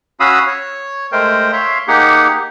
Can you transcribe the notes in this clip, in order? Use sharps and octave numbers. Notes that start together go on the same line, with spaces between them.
C#4 F#4 F5 B5 D#6 E6
C#5
G#3 A3 A#4 C5 G5
C#5 E5 F5 C6
A#3 D#4 G4 G#4 F#5